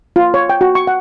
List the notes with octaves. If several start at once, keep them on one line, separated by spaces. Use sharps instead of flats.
F4
C#5
G5
F#4
C#6
F#5